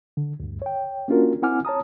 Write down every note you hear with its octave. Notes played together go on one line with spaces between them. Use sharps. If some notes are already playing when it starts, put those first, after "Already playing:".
D3
D2 G2
C#5 G5
A#3 C#4 D4 F4 F#4 A#4
C4 E4 F#5 G#5 D6 F6
C#5 A5 A#5 D#6